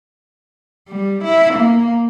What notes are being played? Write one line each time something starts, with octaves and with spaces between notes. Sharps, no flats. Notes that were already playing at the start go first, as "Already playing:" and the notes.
G3
E4
A#3